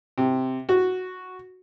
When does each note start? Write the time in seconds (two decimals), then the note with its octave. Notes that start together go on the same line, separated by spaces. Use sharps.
0.18 C3
0.69 F#4